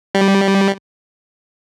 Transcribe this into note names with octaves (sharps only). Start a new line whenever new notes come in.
G3